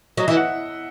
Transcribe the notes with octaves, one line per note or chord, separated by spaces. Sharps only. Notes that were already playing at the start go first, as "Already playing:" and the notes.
F#3 D#5
E3 E5
F#5